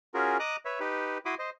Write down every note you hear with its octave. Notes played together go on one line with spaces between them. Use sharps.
C#4 F4 F#4 G#4 A#4
D#5 A#5 D6 D#6 F#6
B4 C#5 E5
D#4 G4 B4
E4 F#4 B5 C6 D6 D#6
C5 D#5